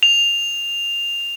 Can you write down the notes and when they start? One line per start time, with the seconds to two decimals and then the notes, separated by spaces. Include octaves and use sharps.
0.03 F7